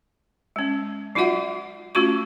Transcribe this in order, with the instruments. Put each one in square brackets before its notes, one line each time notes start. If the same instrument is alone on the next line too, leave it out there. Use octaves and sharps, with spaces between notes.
[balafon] G#3 C#4
F#3 D#4 F4 F#4 E5 F#5
A3 C#4 F4 F#4 C#6